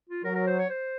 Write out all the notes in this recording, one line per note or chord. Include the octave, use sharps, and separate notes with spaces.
F4
F#3 A#4
A#4
C5
C#5
C5